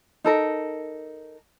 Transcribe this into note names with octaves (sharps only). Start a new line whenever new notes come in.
D#4 A4 A#4